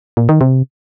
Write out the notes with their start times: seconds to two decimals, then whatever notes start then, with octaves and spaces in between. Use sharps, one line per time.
0.17 A#2
0.29 D#3
0.41 C3